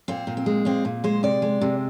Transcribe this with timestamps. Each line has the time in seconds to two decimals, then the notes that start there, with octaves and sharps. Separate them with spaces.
0.08 A#2 C4
0.27 A#2
0.37 C4
0.46 G#3
0.65 A#2 C4
0.85 A#2
1.04 G#3 C5
1.23 C3 D5
1.42 G#3
1.61 C3